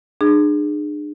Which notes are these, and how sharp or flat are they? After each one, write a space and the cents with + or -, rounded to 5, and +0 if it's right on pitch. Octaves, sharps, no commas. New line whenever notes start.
D4 +40 G#4 +0